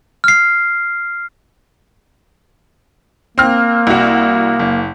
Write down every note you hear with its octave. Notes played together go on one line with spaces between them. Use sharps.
F6 C7
A#3 C4 F6
C2 F#4
F#1